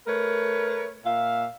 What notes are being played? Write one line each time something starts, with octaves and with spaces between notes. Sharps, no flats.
A3 A#4 B4 C#5
A#2 E5 F5